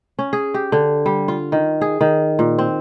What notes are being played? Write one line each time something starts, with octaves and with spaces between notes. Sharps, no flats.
C#4
G#4
G4
D3
G3
F4
D#3
G#4
D#3
A#2
C4